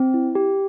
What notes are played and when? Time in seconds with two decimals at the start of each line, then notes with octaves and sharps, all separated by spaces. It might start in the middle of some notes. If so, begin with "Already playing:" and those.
Already playing: C4
0.14 E4
0.35 G4